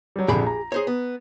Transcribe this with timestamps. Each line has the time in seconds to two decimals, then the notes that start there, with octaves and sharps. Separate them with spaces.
0.16 F#3 G3
0.28 A#1 F2 D3 G4 G#4 B5
0.47 A#5
0.72 G#4 C5 C#5
0.87 B3